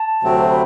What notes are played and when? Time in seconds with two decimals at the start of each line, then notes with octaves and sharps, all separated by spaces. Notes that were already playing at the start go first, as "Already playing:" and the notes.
Already playing: A5
0.22 D2 C3 F#3 A3 C4
0.51 B5